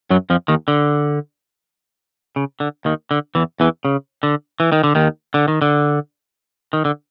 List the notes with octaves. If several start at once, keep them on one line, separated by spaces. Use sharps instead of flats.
F#2 F#3
F2 F3
D#2 D#3
D3
C#3
D3
D#2 D#3
D3
E2 E3
E2 E3
C#3
D3
E3
D#3
D3
D#2 D#3
D3
D#3
D3
D#3
D3